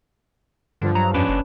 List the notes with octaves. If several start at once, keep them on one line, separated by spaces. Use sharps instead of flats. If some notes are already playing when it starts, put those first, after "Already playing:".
G2 D3 F3
F#3 A#5
F2 C#4 D4 B4
F#1